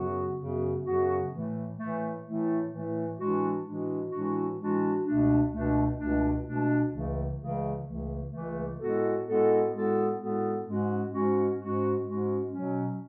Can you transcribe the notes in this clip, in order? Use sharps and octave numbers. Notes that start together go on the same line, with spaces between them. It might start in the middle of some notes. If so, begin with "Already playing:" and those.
Already playing: F#2 C#3 F#3 B3 F#4
F#2 C#3 F#3 B3 F#4
F#2 C#3 F#3 B3 F#4
A2 E3 A3
A2 E3 A3
A2 E3 A3
A2 E3 A3
A2 E3 G#3 D4 F#4
A2 E3 G#3 D4 F#4
A2 E3 G#3 D4 F#4
A2 E3 G#3 D4 F#4
C#2 B2 A3 D4
C#2 B2 A3 D4
C#2 B2 A3 D4
C#2 B2 A3 D4
C#2 C#3 E3 A3
C#2 C#3 E3 A3
C#2 C#3 E3 A3
C#2 C#3 E3 A3
A2 G#3 B3 F#4 A4
A2 G#3 B3 F#4 A4
A2 G#3 B3 F#4 A4
A2 G#3 B3 F#4 A4
G#2 G#3 C#4 F#4
G#2 G#3 C#4 F#4
G#2 G#3 C#4 F#4
G#2 G#3 C#4 F#4
B2 F#3 C#4